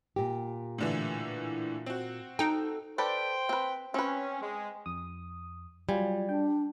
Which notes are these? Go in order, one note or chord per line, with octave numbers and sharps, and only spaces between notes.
A#2 G4
A2 D3 E3
C4 F#4
D#4 A4 G5
A4 B4 C5 D5 G5
C4 B4
C4 C#4 B4
G#3
F2 D#6
F#3 G3 F4 G#5
D4 G5